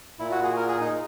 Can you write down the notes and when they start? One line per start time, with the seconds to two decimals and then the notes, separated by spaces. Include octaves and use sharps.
0.19 A#2 E4
0.32 F#4
0.44 G#4
0.56 A#4
0.68 G#4
0.81 D#4